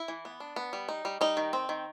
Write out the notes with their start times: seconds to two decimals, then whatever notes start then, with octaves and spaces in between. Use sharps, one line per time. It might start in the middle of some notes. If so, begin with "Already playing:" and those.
Already playing: E4
0.08 E3
0.25 B3
0.40 D4
0.56 B3
0.73 G3
0.89 D#4
1.05 G3
1.21 G3 D#4
1.37 D#3
1.53 C4
1.69 D#3